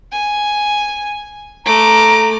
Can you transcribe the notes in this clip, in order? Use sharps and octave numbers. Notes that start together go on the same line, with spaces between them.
G#5
A3 A#5 D6